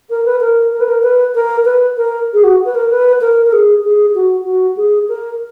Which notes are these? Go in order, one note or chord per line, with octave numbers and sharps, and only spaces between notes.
A#4
B4
A#4
A#4
B4
A#4
B4
A#4
B4
A#4
G#4
F#4
B4
A#4
B4
A#4
A#4
G#4
G#4
F#4
F#4
G#4
A#4